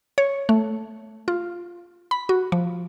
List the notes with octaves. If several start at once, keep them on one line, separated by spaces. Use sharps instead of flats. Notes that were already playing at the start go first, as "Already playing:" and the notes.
C#5
A3
F4
B5
F#4
F3